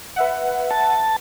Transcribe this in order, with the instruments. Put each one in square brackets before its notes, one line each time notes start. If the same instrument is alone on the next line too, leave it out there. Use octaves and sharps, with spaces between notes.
[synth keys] B4 E5 F#5
[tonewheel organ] A5